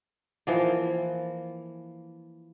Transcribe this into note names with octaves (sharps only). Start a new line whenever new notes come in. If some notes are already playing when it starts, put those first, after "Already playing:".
E3 F3 A#3